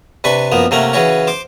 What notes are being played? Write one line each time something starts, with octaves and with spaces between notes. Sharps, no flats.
C3 D4 B4 B5 C#6
F#2 F3 A#3 B3
C3 A3 A#3 C#4 F#5 A#5
C#3 E3 C#4 F#4 C#5
C5 D6